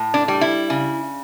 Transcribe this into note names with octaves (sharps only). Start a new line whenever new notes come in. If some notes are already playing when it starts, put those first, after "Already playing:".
Already playing: A2
D4
G3
E4
C#3